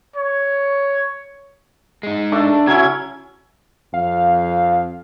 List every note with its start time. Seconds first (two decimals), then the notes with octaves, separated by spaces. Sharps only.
0.16 C#5
2.03 G#3 D#4
2.32 A3 D4 A4
2.67 C#3 F#3 C#4 E4 G#6
3.94 F2 F5